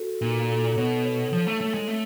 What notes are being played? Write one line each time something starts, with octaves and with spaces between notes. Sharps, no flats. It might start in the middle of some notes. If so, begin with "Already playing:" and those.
Already playing: F#4 A4
A#2 D#4
A4
B2 C#5
C#5
F3 C#5
A3
A3 C#5
G#3
A3 C4